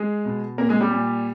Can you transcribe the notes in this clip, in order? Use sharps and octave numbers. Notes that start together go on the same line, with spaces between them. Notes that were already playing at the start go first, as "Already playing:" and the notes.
Already playing: G#3 G#4
B2
A#2 A#3 A#4
G#3 G#4
G3 G4
A#2